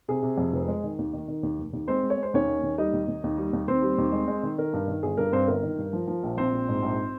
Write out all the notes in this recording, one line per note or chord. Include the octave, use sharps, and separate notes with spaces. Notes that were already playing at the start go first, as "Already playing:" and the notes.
C3 G#4
C3
F2
F1
G#3
D#3
D#2
D#3
D#3
D#2
F1
D#2
G#3 C4 C5
G#3
C#5
G#3 C5
D#2 C#4 C#5
D#3
D#2
G3 D#4 D#5
D#2
D#2
D#2
G3
D#2
D#2 C4 C5
G3
D#2
G#3
G#3
D#3
D#3 A#4
G2
D#3
G1 G#4
G2 A#4
G2 C4 C5
G1 A#4
D#3
G2
F3
F3
A#1
A#1 C4 C5
A#1
G#2
A#1